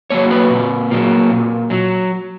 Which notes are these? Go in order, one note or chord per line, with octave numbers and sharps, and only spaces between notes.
F#3 A#3 C#5
B4
A#2
F#3 A#3
A#2
F#3